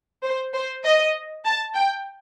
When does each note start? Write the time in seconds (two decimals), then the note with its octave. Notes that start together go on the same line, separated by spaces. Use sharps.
0.24 C5
0.53 C5
0.84 D#5
1.45 A5
1.74 G5